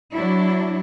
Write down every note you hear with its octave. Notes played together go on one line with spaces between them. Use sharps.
F#3 D4 E4